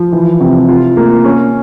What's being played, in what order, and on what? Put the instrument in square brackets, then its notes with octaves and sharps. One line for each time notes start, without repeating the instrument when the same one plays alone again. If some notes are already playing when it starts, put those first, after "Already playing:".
Already playing: [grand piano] F3
E3
C3
F4
A#3
C#4